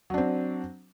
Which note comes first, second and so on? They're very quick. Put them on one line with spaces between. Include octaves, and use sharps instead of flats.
F#3 D4 C4